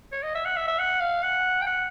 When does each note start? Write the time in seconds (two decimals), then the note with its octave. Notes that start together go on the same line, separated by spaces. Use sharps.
0.12 C#5
0.23 D#5
0.35 E5
0.45 F#5
0.57 E5
0.68 E5
0.79 F#5
1.00 F5
1.23 F#5
1.61 G5
1.67 F#5